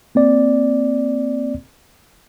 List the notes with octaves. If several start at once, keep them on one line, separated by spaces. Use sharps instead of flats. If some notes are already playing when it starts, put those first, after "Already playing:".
A#3 C4 D5